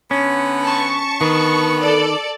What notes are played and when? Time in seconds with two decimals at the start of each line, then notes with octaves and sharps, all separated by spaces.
0.11 D3 B3 C#4
0.65 A5 C#6
1.21 D3 D#3 B3
1.79 A4 D5